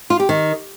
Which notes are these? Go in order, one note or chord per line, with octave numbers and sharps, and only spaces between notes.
F4
G4
D#3